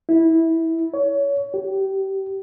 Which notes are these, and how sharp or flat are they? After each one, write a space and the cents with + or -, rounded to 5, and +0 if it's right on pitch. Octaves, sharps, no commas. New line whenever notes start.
E4 -15
C#5 +25
G4 -25